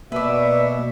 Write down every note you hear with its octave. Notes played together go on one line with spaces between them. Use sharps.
B2 A#3 B4 D5 E5